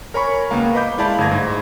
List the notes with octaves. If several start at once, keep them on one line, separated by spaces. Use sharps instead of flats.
A#4 C#5 G#5 B5 C#6
C#2 A#3 B3 F5 A#5
B4 D#5 B5 D6 G6
G#3 E4 D5 F5 A5 B5
G1 A3 G#6 A#6
G#2